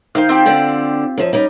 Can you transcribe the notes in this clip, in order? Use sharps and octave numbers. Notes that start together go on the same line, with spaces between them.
D#3 C5 F5 F6
C4 F4 G4
D3 D5
F#2 F3
G3 C#4 D#4